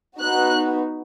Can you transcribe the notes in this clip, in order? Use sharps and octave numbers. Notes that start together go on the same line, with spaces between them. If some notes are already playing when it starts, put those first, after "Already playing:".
B3 D#4 F#4 F#6